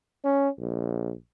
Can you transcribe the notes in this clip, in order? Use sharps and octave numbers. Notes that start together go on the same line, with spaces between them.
C#4
A#1